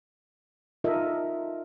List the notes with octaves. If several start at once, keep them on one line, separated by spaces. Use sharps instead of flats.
D#4 F4 A4 A#4 D#5 E5